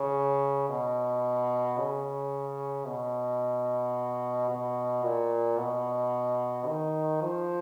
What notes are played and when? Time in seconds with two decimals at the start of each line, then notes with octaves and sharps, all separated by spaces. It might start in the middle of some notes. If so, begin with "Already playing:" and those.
Already playing: C#3
0.69 B2
1.78 C#3
2.86 B2
4.50 B2
5.04 A#2
5.58 B2
6.66 D#3
7.21 F3